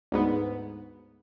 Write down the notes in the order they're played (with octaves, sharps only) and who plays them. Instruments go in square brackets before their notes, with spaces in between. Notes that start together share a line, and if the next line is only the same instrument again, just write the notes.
[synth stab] D2 G#2 B3